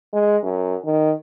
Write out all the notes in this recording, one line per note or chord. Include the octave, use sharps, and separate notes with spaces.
G#3
F#2
D#3